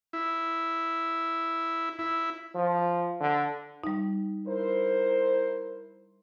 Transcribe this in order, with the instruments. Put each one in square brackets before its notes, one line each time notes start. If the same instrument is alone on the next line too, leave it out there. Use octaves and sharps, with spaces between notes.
[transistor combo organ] E4
E4
[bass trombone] F3
D3
[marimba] G3 D#4
[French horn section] E4 A#4 C5